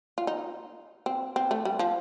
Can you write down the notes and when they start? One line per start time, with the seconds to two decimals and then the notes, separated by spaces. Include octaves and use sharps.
0.18 F4
0.27 D#4
1.06 C4
1.36 C4
1.51 A3
1.65 G3
1.79 F3